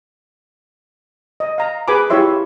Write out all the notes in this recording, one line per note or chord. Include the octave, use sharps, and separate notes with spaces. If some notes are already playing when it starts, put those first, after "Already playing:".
D#5
F5 A#5
G#4 B4 G#5 B5 D6
E4 F4 G4 C#5 E5 C6